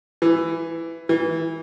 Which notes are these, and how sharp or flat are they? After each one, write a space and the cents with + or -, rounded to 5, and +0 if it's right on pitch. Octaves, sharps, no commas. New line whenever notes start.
E3 +10
E3 -15